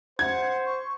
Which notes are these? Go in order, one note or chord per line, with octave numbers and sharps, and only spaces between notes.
C5 F#5 G#6
C#6